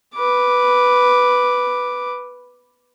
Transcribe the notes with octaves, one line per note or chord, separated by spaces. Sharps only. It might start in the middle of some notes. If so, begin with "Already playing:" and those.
B4 D6